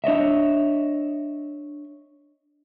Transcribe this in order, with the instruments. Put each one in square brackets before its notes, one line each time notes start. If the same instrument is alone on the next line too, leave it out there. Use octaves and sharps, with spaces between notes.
[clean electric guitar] D4 C#5 D#5 E5